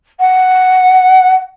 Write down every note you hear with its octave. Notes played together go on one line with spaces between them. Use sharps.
F#5